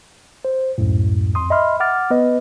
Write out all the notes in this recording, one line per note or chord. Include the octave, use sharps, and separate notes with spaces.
C5
C#2 F#2 A2
F2 C6 D#6
D#5 E5 B5 C6 F6
F#5 D6 F6 A6
B3 B4 D#5